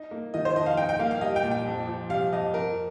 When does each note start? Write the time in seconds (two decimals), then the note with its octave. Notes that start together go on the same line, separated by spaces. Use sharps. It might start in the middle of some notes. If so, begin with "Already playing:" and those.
Already playing: D#4
0.11 A#3
0.34 D#3 D#5
0.45 C5
0.56 F2 D#5
0.66 F5
0.77 D#4 G5
0.89 G5
0.99 A#3 F5
1.11 F5
1.21 G3 D#5
1.36 G5
1.44 A#2
1.51 G5
1.66 F2
1.87 F3
2.09 C3 F5
2.32 F2 D#5
2.54 F2 A#4